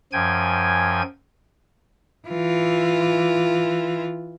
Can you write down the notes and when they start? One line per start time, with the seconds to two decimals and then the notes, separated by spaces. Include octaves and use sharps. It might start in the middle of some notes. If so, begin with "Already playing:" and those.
0.12 F#2 F3 G5 G#5 G#6
2.29 E3 F4